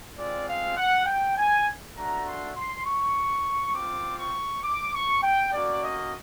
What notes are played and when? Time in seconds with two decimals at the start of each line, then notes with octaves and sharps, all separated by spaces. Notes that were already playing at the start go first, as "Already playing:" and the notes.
0.17 G#3 C4 F4 D5
0.47 F5
0.76 F#5
1.06 G5
1.37 G#5
1.95 A3 D4 F#4 A#5
2.26 C6
2.55 C6
2.85 C#6
3.74 C4 F4 D6
4.19 C#6
4.63 D6
4.93 C#6
5.22 G5
5.52 A#3 C#4 F#4 D5
5.82 D#5